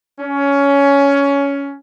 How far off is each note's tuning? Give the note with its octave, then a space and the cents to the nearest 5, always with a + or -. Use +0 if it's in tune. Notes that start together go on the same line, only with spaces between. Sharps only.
C#4 +15